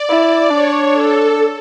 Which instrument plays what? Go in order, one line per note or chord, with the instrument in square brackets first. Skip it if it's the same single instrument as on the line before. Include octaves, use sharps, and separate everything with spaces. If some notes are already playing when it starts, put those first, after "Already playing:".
Already playing: [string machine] D5
[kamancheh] E4
[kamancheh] D4 [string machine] C#5
[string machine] A4